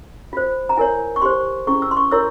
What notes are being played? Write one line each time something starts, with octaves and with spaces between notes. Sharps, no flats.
F4 C5
A#5
E4 A#4 C#5 G#5
C#6
G4 C5 C6
C#4 E4 G#4 C#6
E6
C6
C#6
E4 A#4 C#5 E6